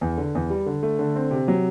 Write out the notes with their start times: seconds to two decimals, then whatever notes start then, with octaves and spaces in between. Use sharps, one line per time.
0.01 E2
0.18 D3
0.35 E2
0.50 G3
0.66 D3
0.83 A3
0.99 D3
1.16 C4
1.31 C3
1.48 F#3